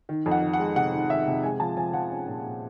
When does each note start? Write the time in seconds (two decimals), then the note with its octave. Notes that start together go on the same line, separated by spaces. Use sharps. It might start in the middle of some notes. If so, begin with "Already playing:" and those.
0.09 D#3
0.26 F2
0.31 F#5
0.42 D#3
0.53 F#5
0.59 G#3
0.76 C3 F#5
0.93 D#3
1.09 D#3 E5
1.27 C3
1.43 G#3 G#5
1.60 F3 A5
1.77 F3 G#5
1.94 F3 F#5
2.11 C#4
2.28 A#2
2.45 A#2